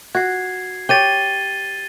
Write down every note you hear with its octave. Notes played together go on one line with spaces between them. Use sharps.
F#4 G#6 C7
G4 C#5 A6 D#7 G7